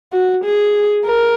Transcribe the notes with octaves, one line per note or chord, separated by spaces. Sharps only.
F#4
G#4
A#4